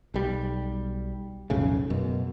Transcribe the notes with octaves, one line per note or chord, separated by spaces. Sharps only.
B1 G3
B1 F2 A2 C#3
F#2 B2